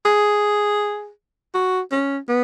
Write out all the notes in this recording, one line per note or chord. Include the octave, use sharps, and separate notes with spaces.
G#4
F#4
C#4
B3